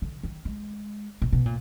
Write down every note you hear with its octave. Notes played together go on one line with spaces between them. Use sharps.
D3
D#3
G#3
A#2
B2
A#2